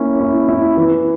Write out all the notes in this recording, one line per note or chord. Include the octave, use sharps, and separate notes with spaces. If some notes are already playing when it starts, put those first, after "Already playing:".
Already playing: A#3 C#4 E4
E4
E4
E3